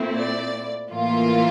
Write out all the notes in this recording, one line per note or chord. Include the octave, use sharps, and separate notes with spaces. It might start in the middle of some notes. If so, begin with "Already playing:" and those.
Already playing: A#2 A3 C4 E4
D5
A2 E3 A#3 F4